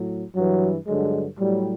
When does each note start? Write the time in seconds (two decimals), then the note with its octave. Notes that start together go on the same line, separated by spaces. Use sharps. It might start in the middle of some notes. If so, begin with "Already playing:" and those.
Already playing: A2 F#3
0.35 G2 E3 F#3
0.87 G2 D3 F#3 G#3
1.39 A2 F#3 G3